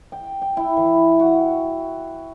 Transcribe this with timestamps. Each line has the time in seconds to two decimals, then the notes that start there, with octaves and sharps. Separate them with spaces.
0.12 G5
0.42 G5
0.57 E4
0.77 E3
1.20 F#4